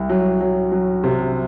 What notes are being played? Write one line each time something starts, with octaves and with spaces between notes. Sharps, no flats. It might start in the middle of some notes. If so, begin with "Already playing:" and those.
Already playing: C2
F#3
F#3
F#3
C3